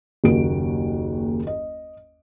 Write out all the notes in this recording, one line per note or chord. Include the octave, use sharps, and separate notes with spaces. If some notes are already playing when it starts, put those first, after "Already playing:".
F#1 D#2 F#4 D7
D#5